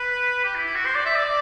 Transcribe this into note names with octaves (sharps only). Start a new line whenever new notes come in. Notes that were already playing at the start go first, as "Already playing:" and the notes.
Already playing: B4
G4
E4
E4
F#4
C5
D5
E5
D5